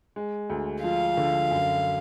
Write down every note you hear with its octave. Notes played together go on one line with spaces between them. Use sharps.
G#3
D2
F3 F5
D3
F#2